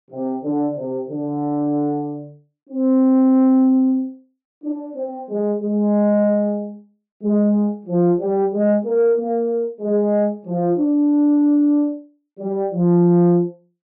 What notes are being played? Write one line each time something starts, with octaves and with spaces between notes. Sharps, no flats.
C3
D3
C3
D3
C4
D4
C4
G#3
G#3
G#3
F3
G3
G#3
A#3
A#3
G#3
F3
D4
G3
F3